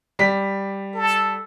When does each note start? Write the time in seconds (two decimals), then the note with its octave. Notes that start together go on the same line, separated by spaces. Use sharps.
0.19 G3 B6
0.94 A4